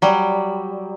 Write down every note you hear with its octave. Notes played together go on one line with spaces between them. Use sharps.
F#3 G3